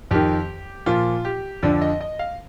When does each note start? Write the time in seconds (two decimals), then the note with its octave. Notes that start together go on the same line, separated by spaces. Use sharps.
0.11 F2 D#3 G4
0.86 A#2 F3 F4
1.25 G4
1.63 F2 D3 F3 D5
1.82 D#5
2.01 D#5
2.19 F5